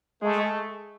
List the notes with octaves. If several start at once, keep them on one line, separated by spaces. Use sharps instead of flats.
G#3 A3